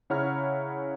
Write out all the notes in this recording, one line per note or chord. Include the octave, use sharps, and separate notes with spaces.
C#3 E4 C#5 F#5 A#5 F6